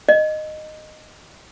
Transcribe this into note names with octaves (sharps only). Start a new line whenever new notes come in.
D#5